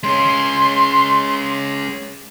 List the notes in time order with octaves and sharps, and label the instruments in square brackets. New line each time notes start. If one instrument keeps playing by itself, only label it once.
[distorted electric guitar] G#3 C#4 [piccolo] C6